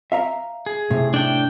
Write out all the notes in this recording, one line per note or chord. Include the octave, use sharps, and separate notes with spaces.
E5 F5 A#5
G#4
A2 C3
D4 G5